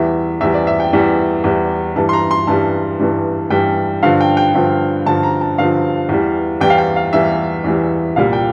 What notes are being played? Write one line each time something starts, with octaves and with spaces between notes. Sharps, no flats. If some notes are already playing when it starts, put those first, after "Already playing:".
Already playing: E2 E3 G3 E5
E2 E3 G3 E5
D5
E5
G5
E2 E3 G3
E2 E3 G3
G2 E3 G3 A5
C6
A#5
C6
G2 E3 G3 A5
G2 E3 G3
G2 E3 G3 G5
G2 D3 F3 F5
G5
G5
G2 D3 F3
G2 D3 F3 A5
A#5
A5
G2 D3 F3 F5
E2 E3 G3
E2 E3 G3 G5
F5
G5
F5
E2 E3 G3 E5
E2 E3 G3
C2 A#2 G3 F5
G5